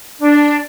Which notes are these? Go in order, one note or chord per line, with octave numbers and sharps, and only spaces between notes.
D4